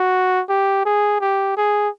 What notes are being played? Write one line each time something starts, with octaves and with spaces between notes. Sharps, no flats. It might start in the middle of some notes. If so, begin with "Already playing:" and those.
Already playing: F#4
G4
G#4
G4
G#4